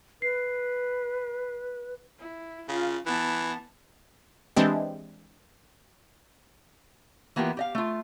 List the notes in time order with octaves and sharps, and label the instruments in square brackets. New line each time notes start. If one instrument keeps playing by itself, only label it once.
[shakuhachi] B4 [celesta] C7
[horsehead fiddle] E4
[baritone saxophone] C#3 [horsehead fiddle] F4
[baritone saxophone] E3 [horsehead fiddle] B3 A5
[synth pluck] E3 G#3 C4 D4 G4
[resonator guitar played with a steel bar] E3 A#3 B3 E4 F4 G4
G4 D#5 F5
A3 F4